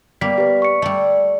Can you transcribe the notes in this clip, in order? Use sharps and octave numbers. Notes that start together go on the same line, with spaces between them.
G3 A#3 B3 B6
G4 B4
C#6 C#7
G3 A3 D5